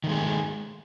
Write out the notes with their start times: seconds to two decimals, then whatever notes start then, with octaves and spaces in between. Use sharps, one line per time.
0.04 D#3
0.07 A3
0.09 G#3
0.12 G#4